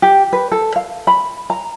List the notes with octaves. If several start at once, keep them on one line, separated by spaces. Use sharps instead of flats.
G4
B4
A4
F5
B5
A#5